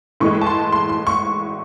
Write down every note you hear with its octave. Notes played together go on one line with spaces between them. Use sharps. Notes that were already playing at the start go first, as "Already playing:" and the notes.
A2 E3 G#3 C#6
A5
C6
C6
C6
C#6